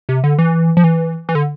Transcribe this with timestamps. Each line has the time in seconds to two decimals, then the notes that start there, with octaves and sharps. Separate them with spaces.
0.09 C3
0.24 D3
0.39 E3
0.77 F3
0.84 E3
1.29 E3
1.35 D3